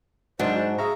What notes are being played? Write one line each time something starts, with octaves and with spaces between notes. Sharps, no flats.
G#2 F#3 D4 C5 F#5
F#4 F#5
G#4 E5 F5 A#5 C#6